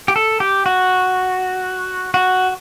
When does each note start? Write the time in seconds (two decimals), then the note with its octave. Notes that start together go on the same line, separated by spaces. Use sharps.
0.08 G4
0.16 A4
0.40 G4
0.66 F#4
2.14 F#4